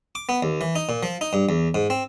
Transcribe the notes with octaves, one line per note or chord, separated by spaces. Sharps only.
D6
B3
D#2
E3
D#4
A#2
F3
D#4
G2
E2
G#2
C4